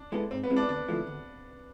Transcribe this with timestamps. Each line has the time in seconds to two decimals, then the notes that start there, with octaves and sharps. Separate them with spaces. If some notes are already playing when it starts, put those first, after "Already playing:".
Already playing: D4
0.12 G#3 B3 E4 A4
0.31 G#2 C4
0.43 B3
0.50 G#3 C4 E4
0.56 D4
0.69 D2 D4
0.88 D3 F3 A3 E4
1.07 D2